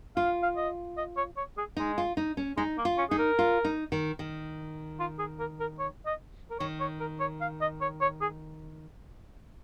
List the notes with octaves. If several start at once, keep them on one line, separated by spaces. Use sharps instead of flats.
F4 F5
F5
D#5
D#5
C#5
C#5
G#4
G#3 D#4
F4
D#4
C#4
G#3 D#4
A#3
F4
C#4
D#4 G#4
A#4
F4
D#4
D#3
D#3
F4
G#4
A#4
A#4
C#5
D#5
A#4
D#3 C#5
C#5
A#4
C#5
F5
D#5
C#5
C#5
G#4